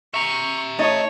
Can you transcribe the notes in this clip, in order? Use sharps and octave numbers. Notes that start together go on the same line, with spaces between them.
E5 A#5 C#6
A3 D#4 C#5 D#5